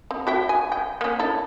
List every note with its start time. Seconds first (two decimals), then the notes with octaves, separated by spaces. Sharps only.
0.11 C4
0.27 F#4 E5 G5
0.49 G#5
0.72 G5
1.01 A#3 C#4
1.19 E4 A4